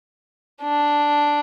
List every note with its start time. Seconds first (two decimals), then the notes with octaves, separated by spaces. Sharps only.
0.62 D4